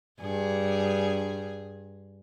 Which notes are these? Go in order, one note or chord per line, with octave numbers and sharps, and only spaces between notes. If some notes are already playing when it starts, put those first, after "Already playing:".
G2 G#4